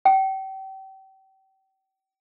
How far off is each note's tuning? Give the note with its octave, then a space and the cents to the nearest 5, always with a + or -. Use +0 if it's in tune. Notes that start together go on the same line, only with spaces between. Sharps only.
G5 -35